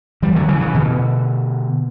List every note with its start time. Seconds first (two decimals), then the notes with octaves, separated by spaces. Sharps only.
0.22 E3 G3
0.35 D3 F#3
0.48 C#3 E3
0.61 C#3 E3
0.75 B2 D3